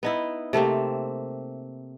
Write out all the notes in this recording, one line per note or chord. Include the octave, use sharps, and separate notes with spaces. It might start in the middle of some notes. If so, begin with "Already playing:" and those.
B3 D#4 E4
C3 A3 A#3 C4